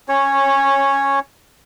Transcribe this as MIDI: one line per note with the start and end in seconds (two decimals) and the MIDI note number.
0.09 1.19 61
0.09 1.19 73